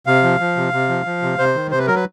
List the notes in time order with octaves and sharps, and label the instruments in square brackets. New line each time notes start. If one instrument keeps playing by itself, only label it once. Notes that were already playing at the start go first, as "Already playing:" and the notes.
[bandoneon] C3 F5
F3
F3
C3
C3
F3
F3
C3
C3 C5
D#3
C3 C5
B4
F#3 A#4
B4